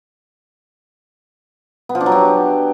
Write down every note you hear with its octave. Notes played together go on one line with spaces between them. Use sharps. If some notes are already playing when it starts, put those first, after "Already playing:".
B3
F3
D4
F#3
G4